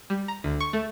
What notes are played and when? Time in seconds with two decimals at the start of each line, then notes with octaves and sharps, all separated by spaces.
0.10 G3
0.28 A#5
0.44 D2
0.60 C#6
0.73 A3